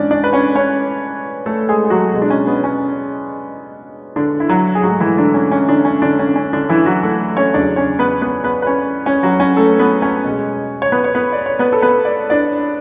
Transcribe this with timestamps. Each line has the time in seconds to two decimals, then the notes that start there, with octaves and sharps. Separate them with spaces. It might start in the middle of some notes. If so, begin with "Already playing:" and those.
Already playing: G#2 E3 C#4 D4 D5
0.11 D4 D5
0.24 B4
0.33 C#4 C#5
0.55 C#4 C#5
1.46 A3 A4
1.69 G#3 G#4
1.85 G#4
1.90 F#3 F#4
2.13 B2 G#3
2.22 D4
2.30 C#4
2.47 B3
2.64 C#4
4.16 D3 D4
4.40 E4
4.49 F#3 F#4
4.75 G#4
4.84 G#2 F#3 A3 F#4
5.00 E3 E4
5.17 D3 D4
5.34 C#4
5.51 C#4
5.68 D3 D4
5.85 C#4
6.02 D3 D4
6.19 C#4
6.36 C#4
6.53 D3 D4
6.69 E3 E4
6.86 F#3 F#4
7.03 A3 A4
7.37 C#4 C#5
7.54 E2 C#3 F#3 D4 D5
7.76 C#4 C#5
7.99 B3 B4
8.21 B3 B4
8.44 B3 B4
8.62 B4
8.67 C#4 C#5
9.06 C#4 C#5
9.23 F#3 F#4
9.40 C#4
9.57 A3 A4
9.79 B3 B4
10.02 C#4 C#5
10.24 B2 G#3
10.82 C#5
10.92 B3 B4
11.04 C#5
11.15 B3 B4
11.32 D5
11.46 C#5
11.59 B3 B4
11.73 A4
11.82 B3 B4
12.05 D5
12.30 D4 D5